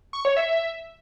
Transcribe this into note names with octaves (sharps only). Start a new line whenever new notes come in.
C#6
C#5
E5